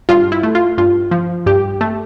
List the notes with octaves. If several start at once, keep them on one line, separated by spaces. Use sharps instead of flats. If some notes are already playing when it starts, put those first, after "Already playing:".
G2 F4
E4
A3
F4
G2 F4
F3
G2 G4
A3